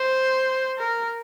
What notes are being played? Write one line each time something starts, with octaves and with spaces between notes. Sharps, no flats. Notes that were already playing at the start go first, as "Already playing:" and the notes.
Already playing: C5
A#4